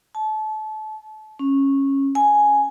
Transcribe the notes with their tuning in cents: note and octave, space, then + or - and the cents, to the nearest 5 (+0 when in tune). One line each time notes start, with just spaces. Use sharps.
A5 -30
C#4 -15
G#5 +5